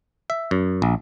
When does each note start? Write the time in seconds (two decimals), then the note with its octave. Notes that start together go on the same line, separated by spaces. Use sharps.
0.30 E5
0.51 F#2
0.82 A#1